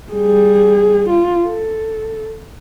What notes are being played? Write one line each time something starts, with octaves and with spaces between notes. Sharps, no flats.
G3 G#4
F4
A4